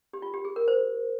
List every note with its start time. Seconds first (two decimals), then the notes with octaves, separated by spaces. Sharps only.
0.13 G4
0.22 F4
0.34 G4
0.45 G#4
0.56 A#4
0.68 C5